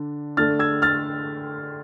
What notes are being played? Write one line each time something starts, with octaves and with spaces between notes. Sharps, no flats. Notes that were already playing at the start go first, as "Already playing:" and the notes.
Already playing: D3 D4
D3 A3 D4 F6 A6
E6 G#6
F6 A6